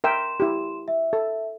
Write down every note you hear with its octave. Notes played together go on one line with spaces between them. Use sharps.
A#4 E5 G5 C6 E7
E4 G4
E5
A4